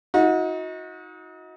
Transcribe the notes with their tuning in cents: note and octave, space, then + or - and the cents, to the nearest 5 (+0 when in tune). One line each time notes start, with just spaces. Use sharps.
D#4 +30 F#4 -30